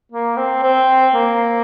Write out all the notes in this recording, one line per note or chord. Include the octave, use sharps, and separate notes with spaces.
A#3
C4
C4
A#3